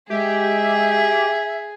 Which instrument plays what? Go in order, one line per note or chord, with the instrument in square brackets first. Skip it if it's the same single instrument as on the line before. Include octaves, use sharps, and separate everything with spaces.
[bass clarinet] G#3 [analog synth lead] G4 [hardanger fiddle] G#4 [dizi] E5